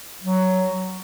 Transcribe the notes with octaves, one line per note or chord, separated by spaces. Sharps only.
F#3